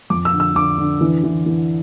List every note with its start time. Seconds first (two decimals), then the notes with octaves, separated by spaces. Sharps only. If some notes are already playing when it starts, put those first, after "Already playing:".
0.10 F2 D6
0.25 E6
0.33 D3
0.40 E6
0.55 D3 D6
0.78 D3
1.01 E3
1.24 E3
1.46 E3